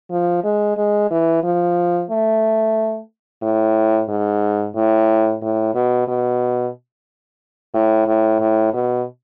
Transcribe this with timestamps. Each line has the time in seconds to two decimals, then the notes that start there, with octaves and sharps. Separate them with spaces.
0.11 F3
0.44 G#3
0.77 G#3
1.11 E3
1.44 F3
2.10 A3
3.43 A2
4.09 G#2
4.76 A2
5.42 A2
5.75 B2
6.08 B2
7.74 A2
8.07 A2
8.40 A2
8.74 B2